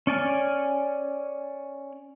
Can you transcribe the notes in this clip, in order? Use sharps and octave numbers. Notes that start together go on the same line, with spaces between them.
C#4 D5 G#5 F6